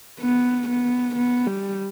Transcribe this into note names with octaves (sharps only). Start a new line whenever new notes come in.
B3
B3
B3
G3